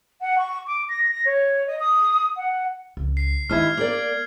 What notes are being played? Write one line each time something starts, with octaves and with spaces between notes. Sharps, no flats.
F#5
C#6
D6
A#6
A#6
C#5
D#5
D#6
F#5
C#2
C7
D#2 D4 E4 A5 F6 G#6
A#3 A#4 D5